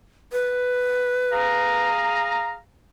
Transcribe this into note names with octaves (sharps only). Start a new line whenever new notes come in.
B4
G#4 F5 A#5